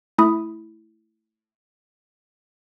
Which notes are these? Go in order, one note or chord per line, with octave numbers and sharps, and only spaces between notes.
A3 E4 B5 D#6